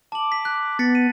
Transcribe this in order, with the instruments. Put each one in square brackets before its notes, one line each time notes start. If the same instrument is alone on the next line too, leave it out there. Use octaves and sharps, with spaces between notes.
[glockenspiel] A5 F#7 [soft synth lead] D6
[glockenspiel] B6
F#6
[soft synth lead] B3 [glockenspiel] A6 B6 C#7
[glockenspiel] D#7